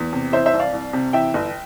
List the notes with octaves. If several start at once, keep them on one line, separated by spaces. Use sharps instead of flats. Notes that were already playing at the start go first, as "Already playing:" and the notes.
Already playing: E2
C3
E3 C5 E5
C5 E5
C2
D5 F5
C2
C3
E3 E5 G5
G1